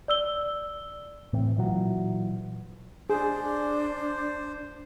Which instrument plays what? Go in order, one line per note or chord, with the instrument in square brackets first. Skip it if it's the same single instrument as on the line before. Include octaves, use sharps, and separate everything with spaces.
[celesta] D5 E6 G7
[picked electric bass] A2 E3 C4
A#2 E3 F#3
[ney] D4 [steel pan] G#4 [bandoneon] C5